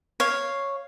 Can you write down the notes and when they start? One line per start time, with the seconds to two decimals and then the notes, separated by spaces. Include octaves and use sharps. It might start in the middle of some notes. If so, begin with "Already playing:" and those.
0.20 C#5 F5